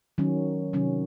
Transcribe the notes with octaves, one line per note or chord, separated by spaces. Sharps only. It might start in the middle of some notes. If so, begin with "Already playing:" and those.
D#3 F#3 C#4
C3 D#3 F#3 C#4